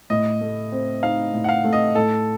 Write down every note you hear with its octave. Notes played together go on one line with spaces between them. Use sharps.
A2 D#5
A3
C4
D#4 F5
A2
F#5
F5
A3
D#5
A2 A4